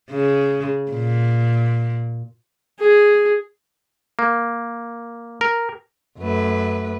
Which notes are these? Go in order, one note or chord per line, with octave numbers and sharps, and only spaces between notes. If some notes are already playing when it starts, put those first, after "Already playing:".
C#3
A#2
G#4
A#3
A#4
F#2 A3 B4